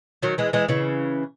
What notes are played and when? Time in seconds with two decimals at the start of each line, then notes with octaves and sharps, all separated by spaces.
0.22 D#3 F#3
0.38 E3 G#3
0.53 E3 G#3
0.68 C#3 E3